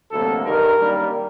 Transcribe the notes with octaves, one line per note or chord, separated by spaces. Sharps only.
D2 C3 F#3 A#3 A4
G2 D#3 G3 A#4
F#2 D#3 G3 A#3